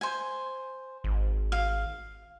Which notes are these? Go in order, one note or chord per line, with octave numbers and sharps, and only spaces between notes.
C5 G#5
G#1
F5